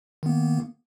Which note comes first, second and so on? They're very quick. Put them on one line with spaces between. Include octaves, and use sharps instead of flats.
D#3 B3 A#3